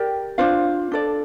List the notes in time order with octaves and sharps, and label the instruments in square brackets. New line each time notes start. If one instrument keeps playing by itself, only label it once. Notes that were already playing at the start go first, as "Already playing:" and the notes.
Already playing: [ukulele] G4 A#4 D5 G5
D4 F4 C5 F5
D4 A4 D5